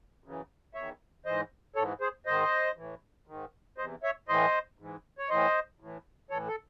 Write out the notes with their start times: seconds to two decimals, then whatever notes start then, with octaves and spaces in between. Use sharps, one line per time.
0.24 F#2 C#3 E3
0.74 E2 D#3 C#5 E5
1.25 G#2 E3 C5 D#5
1.76 G#2 E3 A4 C#5
2.01 G#4 C5
2.26 G#2 D#3 C5 D#5
2.77 A2 E3
3.27 G#2 D#3
3.78 E2 C3 E3 C5 D#5
4.03 C#5 E5
4.28 A2 E3 C5 D#5
4.79 G#2 E3
5.18 C#5
5.29 A2 E3 C5 D#5
5.80 A2 E3
6.30 A2 E3 A4 C#5
6.48 A4